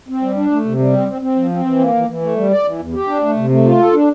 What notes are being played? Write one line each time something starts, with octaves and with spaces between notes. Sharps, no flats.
C4
G3
D4
A3
C3
G3
C4
C4
C4
F3
C4
E3
A#3
E3
E3
A3
G3
D5
E3
E2
G4
D4
A3
C3
A3
F4
A4
D4